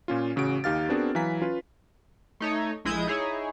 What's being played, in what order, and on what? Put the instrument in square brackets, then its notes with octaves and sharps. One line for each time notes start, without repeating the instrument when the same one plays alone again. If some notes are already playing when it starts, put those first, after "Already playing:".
[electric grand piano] A#2 C#4 F4
A1 C#3 F#4 D7
D#2 D#4 G4 F5 F6 A6
B3 C4 D4 F#4 G#4 A#4
E3 F#3 F5 G#5 A#5 B6
C#4 F4 B4
[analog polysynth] A3 D#4 C#5
A#1 G#3 E4 D#6 G6 G#6
D#4 E4 G#4 C#5